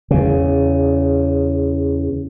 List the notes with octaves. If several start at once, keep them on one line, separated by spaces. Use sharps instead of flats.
E2 C#3